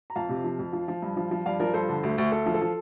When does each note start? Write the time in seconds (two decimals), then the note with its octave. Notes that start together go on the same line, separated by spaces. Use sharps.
0.10 A#5
0.16 F2 F5 A5
0.29 C3
0.44 F3
0.59 F2
0.73 F3
0.88 F3
1.02 G2
1.17 F3
1.31 F3
1.46 G2 D5 F5
1.59 F3 A#4 D5
1.74 G2 A4 C5
1.88 D3
2.03 D2
2.18 D2
2.32 D2 A4
2.46 F3
2.54 A4
2.61 F3